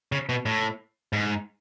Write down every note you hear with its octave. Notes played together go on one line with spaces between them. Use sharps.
C#3
B2
A2
G#2